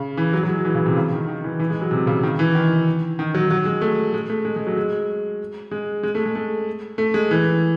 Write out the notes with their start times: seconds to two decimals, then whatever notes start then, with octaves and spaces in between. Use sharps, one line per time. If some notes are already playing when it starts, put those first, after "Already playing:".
Already playing: C#3
0.17 E3
0.33 F#3
0.43 F#3
0.48 G#3
0.65 E3
0.75 C#3
0.86 C3
0.97 C#3
1.12 D#3
1.28 D#3
1.44 E3
1.60 E3
1.70 G#3
1.81 F#3
1.91 C3
2.07 C#3
2.23 D#3
2.39 E3
2.55 D#3
3.19 D#3
3.35 F#3
3.51 F#3
3.65 G#3
3.81 A3
4.14 G#3
4.29 A3
4.45 G#3
4.56 G#3
4.67 F#3
4.77 G#3
5.71 G#3
6.03 G#3
6.15 A3
6.25 G#3
6.35 A3
6.98 A3
7.14 G#3
7.31 E3